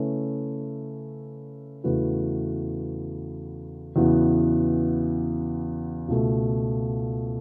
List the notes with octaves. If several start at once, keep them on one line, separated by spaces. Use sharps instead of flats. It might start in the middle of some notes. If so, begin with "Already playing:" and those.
Already playing: C#3 A3 C#4 E4 B4
E2 C#3 A3 F#4 B4
E2 C#3 E3 B3 F#4
C#2 B2 A3